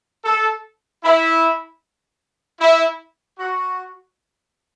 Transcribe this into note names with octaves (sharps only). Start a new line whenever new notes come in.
A4
E4
E4
F#4